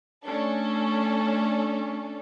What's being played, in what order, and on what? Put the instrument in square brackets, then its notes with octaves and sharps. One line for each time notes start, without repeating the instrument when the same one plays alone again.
[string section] A3 C#4 D4 A4